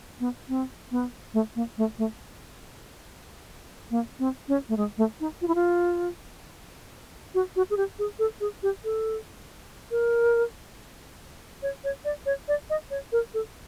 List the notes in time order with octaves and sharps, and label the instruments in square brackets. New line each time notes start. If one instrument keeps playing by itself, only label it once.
[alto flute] B3
C4
B3
A3
A#3
A3
A3
A#3
C4
C#4
A3
G#3
A3
D#4
F4
E4
F4
F#4
F#4
G#4
G4
G#4
A4
G#4
G4
A4
A#4
C#5
C#5
D5
C#5
D5
D#5
C#5
A#4
A4